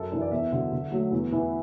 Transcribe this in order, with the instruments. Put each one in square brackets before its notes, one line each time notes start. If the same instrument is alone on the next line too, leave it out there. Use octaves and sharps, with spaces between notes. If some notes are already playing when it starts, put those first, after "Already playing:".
Already playing: [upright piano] F#2 A4
E3 D4
D5
E2 E5
D3 F#3
D3
F#3 A3
E2
E3 B3